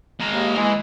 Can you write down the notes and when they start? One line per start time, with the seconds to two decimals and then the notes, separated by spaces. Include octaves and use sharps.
0.20 G#3 A#4
0.31 D#2
0.56 E3 G#3